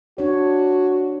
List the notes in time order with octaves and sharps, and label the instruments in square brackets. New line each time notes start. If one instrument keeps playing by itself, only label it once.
[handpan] D4 C#5 [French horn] F#4